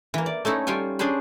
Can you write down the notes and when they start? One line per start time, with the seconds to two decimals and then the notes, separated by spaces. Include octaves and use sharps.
0.14 E3 A#3
0.26 D5
0.45 A3 C#4 D#4 E4
0.67 G3 F4 C#5 G5 G#5
0.99 C#4 D4 G#4 C5 B5